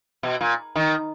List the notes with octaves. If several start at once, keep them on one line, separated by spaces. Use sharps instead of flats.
B2
A#2
D#3